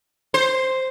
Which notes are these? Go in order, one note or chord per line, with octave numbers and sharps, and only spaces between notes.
C5